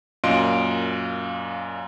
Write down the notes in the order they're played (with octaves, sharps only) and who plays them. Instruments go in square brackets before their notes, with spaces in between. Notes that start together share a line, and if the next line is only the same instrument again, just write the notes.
[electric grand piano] F#2 A#2 D#5 F5 C6 D7